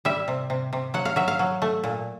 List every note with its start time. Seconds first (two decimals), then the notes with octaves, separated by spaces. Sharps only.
0.05 G3 E5
0.28 C3
0.50 C3
0.73 C3
0.94 F#3 F#5
1.05 F5
1.16 F#3 E5
1.28 F5
1.39 F#3
1.62 A3
1.84 A#2